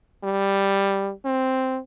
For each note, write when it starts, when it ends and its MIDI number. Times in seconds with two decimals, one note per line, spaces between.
0.24 1.11 55
1.25 1.79 60